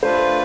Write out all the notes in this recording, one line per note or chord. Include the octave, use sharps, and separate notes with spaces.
A3 D4 F4 B4 C5